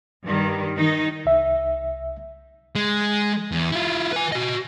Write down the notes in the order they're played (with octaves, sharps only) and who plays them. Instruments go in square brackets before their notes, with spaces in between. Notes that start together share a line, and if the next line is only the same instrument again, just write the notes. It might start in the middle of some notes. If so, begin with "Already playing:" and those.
[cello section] G2 D#3
D#3 D#4
[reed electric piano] C2 E5
[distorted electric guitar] G#3
E2
E4 F4
B4 G#5
F#4 D#5